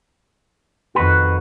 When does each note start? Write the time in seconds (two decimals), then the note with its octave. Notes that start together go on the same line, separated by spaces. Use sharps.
0.95 F2 D#3 F#4 B4